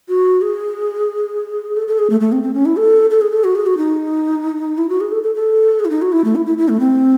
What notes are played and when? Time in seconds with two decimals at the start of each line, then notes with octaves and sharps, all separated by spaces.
0.09 F#4
0.42 G#4
1.77 A4
1.88 A4
1.99 G#4
2.10 A3
2.20 A3
2.32 C4
2.43 C4
2.54 C#4
2.66 E4
2.77 A4
3.10 A4
3.21 G#4
3.33 A4
3.44 F#4
3.55 G#4
3.66 F#4
3.77 D#4
4.78 E4
4.89 F#4
5.01 G#4
5.12 A4
5.23 A4
5.35 A4
5.80 G#4
5.85 E4
5.90 D#4
6.02 F#4
6.12 E4
6.24 A3
6.35 E4
6.46 E4
6.58 E4
6.69 A3
6.80 C4